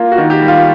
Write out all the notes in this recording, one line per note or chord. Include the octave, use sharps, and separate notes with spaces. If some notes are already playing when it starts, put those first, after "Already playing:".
Already playing: A#3 F4
F#4
D#3
G4
G3
F4